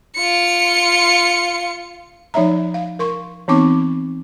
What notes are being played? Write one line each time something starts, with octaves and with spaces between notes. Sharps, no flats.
F4 C#7
F3 D#4 C#5 E5 A#5
F5
A#4 C6 C#6
E3 B3 C4 D#4 C#6 D6